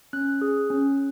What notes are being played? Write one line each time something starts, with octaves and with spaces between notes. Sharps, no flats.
C#4 F#6
G#4
C#4